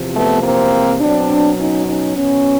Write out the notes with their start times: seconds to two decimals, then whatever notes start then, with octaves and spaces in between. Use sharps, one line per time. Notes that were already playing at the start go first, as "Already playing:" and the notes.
Already playing: E2 C3 F3
0.14 A3 B3
0.42 A#3 C4
1.00 B2 F#3 C4 D4
1.59 C#4 D#4
1.86 C#4 D#4
2.16 E2 B2 F#3 B3 C#4